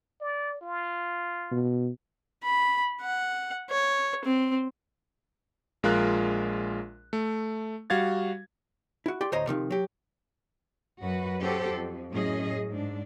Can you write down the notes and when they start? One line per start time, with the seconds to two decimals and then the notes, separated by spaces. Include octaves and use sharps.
0.20 D5
0.61 F4
1.51 B2
2.44 B5
3.01 F#5
3.71 C#5
4.25 C4
5.83 A#1 G#3 F4 A#4 F#6
7.13 A3
7.90 G3 F#4 F5 G#6 A6
9.06 E4 F#4
9.21 G4 D5 C6
9.32 D2 A2 C5 C#5 D#5 A#5
9.47 C3 D#3 F3
9.70 F#3 G4
11.01 F#2 F#4 B4
11.41 C#4 F#4 G4 A4 C5
11.73 F2
12.11 F#2 A2 C#4 G#4 D#5
12.70 G#2 D4